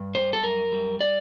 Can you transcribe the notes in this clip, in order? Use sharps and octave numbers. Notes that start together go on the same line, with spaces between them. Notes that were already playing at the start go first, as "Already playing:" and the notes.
Already playing: G2
G3 C5
A4
F#2 A#4
G3
D5